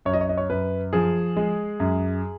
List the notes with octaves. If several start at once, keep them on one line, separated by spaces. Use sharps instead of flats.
F#2 C#5
D#5
C#5
D#5
C#5
F#2 B4
F3 G#4
G#3
F#2